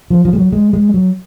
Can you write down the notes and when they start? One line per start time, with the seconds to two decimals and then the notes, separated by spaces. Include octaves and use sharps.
0.10 F3
0.25 F3
0.33 G#3
0.38 F#3
0.53 G#3
0.73 G#3
0.94 F#3